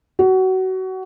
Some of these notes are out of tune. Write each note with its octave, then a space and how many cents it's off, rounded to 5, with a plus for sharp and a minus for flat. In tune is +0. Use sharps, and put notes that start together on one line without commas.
F#4 +25